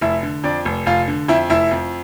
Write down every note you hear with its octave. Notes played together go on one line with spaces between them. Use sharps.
F1 E4 E5
D3
F2 D4 D5
F1
F1 F4 F5
D3
F2 E4 E5
F1 E4 E5
F2